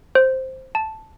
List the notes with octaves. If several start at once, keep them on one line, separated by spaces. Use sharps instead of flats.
C5
A5